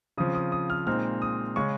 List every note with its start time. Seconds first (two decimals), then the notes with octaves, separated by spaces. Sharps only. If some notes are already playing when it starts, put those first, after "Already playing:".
0.18 C#3 F3 C4 D#6
0.35 D#6
0.52 D#6
0.70 F6
0.87 A#2 G#3 C4 D#4 F6
1.22 D#6
1.56 C#3 G#3 C#4 C#6